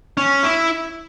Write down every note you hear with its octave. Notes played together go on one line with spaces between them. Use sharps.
C#4
E4